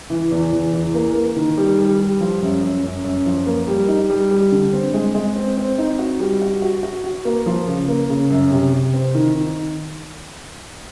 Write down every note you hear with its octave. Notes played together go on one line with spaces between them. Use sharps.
E3
E2
E2
E3
A#3
A#3
D#3
G3
G3
G3
F3
F#2
F#2
F#2
F#2
F3
A#3
G3
D#4
G3
G3
D3
C4
G#3
G#3
C4
C4
D#4
F#4
G3
F#4
F#4
F#4
F#4
A#3
F3
C#3
A#3
C#3
F#2
C3
C3
C4
D#3
D#3